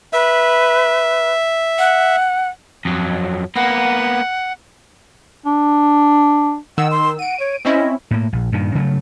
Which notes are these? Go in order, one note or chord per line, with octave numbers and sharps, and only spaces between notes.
B4 E5
F#5
F2 F#3
A#3 B3 F#5
D4
D#3 F#5 E6
C6
F#5 D7 D#7
C#5
C4 C#4 E4 D#5
A2 A#3
A#1
G2 A#2 D#3
C#3 F#3 A3